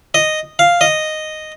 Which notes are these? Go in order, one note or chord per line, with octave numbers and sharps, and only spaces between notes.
D#5
F5
D#5